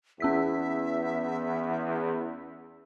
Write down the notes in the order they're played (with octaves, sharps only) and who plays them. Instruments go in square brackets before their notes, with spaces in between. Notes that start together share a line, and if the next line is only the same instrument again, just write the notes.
[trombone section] E2 [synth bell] C#4 E6 B6 [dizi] E5